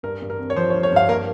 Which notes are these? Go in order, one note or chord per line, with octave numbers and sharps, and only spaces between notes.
G2 A#4
G2
A#4
C4
C#5
F3 C5
C#5
G2
C#5
G2 F5
A#3 A#4